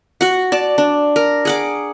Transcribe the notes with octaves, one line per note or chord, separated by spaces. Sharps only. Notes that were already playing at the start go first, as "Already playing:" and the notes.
F#4 F#5
D5 A5
D4
A#4
G#4 F#5 D6